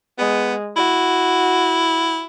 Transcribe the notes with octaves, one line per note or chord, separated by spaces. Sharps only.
G#3 B3
E4 F#4